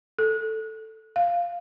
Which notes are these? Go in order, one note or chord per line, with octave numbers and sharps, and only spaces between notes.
A4
F5